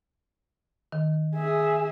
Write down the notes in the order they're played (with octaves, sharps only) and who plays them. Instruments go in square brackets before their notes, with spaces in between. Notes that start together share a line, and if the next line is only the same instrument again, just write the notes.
[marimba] D#3
[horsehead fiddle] G#4 E5